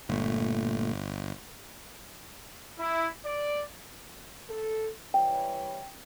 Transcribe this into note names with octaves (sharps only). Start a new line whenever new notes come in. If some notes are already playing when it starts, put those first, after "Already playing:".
G1 A#2 A3
E4
D5
A4
E3 G3 C#5 G5